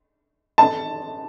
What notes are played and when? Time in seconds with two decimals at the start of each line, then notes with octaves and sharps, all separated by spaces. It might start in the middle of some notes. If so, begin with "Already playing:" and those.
0.58 A5